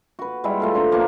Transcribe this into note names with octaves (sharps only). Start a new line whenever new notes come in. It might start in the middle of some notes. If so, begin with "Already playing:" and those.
F#4 B4
G3 G#3 E4
A3 F4 A4
D4 C5 A#5
F3 A#3 B3 D4